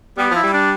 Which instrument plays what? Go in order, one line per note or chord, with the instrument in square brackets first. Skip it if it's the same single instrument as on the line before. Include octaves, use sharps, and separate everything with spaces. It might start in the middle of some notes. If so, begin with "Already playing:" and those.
[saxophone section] G3 [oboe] B3
[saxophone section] F3 [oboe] E4
[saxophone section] G3
[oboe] D4